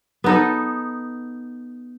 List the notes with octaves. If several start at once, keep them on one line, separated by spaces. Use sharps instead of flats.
B3 D#4 A4